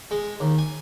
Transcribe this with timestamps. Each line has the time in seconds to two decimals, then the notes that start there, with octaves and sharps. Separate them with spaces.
0.11 G#3
0.40 D#2
0.58 G#5